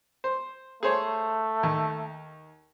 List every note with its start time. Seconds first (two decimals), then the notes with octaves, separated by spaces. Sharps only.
0.24 C5
0.83 A3 G#4 C5 C#5
1.63 D#2